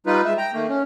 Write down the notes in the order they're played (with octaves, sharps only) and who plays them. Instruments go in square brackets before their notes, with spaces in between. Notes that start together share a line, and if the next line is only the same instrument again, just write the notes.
[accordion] G3 D#4 F4 B4
G#3 E5
G5 A#5
D#3 A3 A#3
C#4